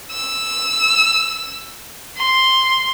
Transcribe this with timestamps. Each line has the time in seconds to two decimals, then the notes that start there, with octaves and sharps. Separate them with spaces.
0.12 E6
2.18 C6